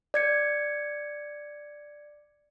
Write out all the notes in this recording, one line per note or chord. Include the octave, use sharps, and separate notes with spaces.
D5 G#6 C#7